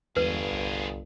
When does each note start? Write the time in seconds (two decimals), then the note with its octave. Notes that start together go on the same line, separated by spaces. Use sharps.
0.17 G1 E2 G#3 F4 G#4 B4
0.51 C2